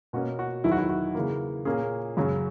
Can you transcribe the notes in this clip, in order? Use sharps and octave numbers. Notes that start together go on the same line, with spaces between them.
B2 A#3 C#4 F#4
F#4
E2 D#3 F#3 E4
F#4
E4
F#4
C#3 E3 A#3
A#2 A#3 C#4 G#4
F#2 C#3 F#3 C#4